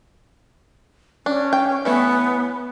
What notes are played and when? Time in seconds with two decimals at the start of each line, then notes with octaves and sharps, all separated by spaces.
1.26 C#4 D4
1.53 G5
1.85 E3 A3 B3 C#4